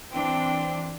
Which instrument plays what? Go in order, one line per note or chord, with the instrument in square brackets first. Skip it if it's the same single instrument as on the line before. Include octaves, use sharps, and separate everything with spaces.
[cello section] E3 C4 D4 [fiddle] G5